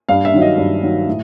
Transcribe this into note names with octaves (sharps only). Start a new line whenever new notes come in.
G2 F5
E5
D#3 F#3
D#5
G2
D#3 F#3
A2